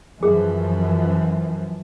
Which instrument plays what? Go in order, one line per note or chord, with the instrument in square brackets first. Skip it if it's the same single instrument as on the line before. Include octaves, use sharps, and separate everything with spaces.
[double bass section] F#2 E3 F3 [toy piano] G#4